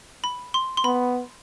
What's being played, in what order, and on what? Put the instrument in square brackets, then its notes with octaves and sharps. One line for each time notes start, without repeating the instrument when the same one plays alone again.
[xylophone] B5
C6
C6
[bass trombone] B3 [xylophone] B5